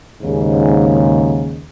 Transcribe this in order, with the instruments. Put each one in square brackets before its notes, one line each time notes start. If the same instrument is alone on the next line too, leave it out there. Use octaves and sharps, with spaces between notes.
[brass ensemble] D#2 G#2 C#3